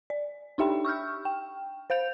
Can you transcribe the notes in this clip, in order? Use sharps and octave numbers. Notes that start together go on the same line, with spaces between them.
D5
D4 D#4 G4 E5 G5 B5
C#6 E6 F6 G6
G5
C5 F5 G6 F7